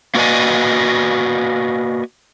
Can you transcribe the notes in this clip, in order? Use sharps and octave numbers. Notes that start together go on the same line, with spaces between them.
A#3 F#4 B4 D5 D#5 G#5